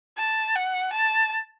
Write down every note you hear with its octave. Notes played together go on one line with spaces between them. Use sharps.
A5
F#5
A5